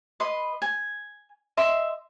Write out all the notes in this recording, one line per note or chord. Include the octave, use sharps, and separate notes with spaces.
B4 D#5 B5 C6
G#5
D#5 E5 C6 D#6